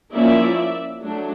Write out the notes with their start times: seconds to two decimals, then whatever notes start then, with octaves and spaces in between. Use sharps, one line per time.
0.12 F3 A#3 C#4 E4 D5 E5
1.03 F#3 A3 D4